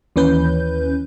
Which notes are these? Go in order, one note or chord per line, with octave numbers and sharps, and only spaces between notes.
D#2 E3 C#4 B4 G6